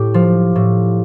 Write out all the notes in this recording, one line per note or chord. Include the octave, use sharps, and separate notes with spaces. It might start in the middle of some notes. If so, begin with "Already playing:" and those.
Already playing: A2 G4
F3
A2